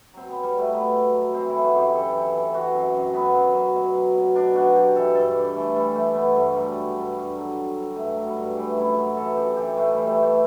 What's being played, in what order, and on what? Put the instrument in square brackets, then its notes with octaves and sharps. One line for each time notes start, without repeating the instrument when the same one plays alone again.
[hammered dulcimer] F#3 C4
B3
F#3
G3
B2 A3
F#3 B3
B2
F#3
E3 C4
E3 E4
F#4
F#2 G4
E3 A4
E3
E3
E3 F#4
F#2
F#2
F#2 B3
F#2
F#2
B2
F#3
B2
B2 D4
B2 F#4
F#3 G4
E3 A4
G2 A4
E3
E3 A3
E3 G3
E3 A3
G2 B3
G2 A3
F#3 G3
G2
G2
G2
F#3
F#3
F#3
G2 A3
F#3
G3
G2
E3 A3
F#2 E4
F#2 F#4
E3 A4
F#2 G4
E3 G4
A2 A3
E3 G3
A3
E3
A3